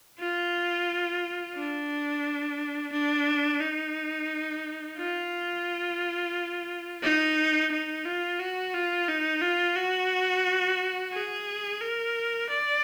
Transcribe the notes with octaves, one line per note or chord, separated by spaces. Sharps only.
F4
D4
D4
D#4
F4
D#4
D#4
F4
F#4
F4
D#4
F4
F#4
G#4
A#4
D5